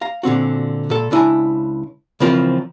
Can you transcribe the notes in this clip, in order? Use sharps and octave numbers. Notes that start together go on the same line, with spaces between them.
F5 A#5
A#2 D3 C4 F#4
A#2 A4
C#2 D4 E4 F5 G#5 A#5
C#3 E3 F3 C4 F4 A#4